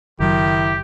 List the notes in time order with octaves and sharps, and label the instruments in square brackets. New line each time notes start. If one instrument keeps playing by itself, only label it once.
[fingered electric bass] F#1 F#3 [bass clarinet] D#3 [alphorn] E4 [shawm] G4